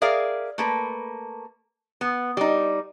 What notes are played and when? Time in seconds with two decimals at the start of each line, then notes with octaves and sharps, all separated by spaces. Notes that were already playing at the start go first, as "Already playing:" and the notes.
0.02 G#4 A#4 D5 E5 F5
0.58 A3 A#3 B4
2.01 B3
2.37 G3 D#4